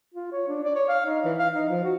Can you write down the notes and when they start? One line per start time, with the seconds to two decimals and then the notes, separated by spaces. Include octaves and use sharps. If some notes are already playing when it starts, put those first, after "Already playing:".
0.14 F4
0.32 C#5
0.48 D4
0.64 D5
0.75 C#5
0.89 F5
1.06 D#4
1.25 E3
1.38 F5
1.55 D#4
1.69 F3
1.84 F#4